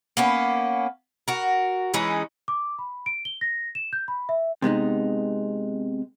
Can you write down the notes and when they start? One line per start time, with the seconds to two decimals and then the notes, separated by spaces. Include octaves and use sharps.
0.17 A#3 B3 C#4
1.28 F#4 A#4
1.94 E3 G#3 C#4 D#4
2.48 D6
2.79 B5
3.06 D7
3.25 G7
3.41 A#6
3.75 E7
3.93 G6
4.08 B5
4.29 E5
4.62 C3 G#3 B3 D#4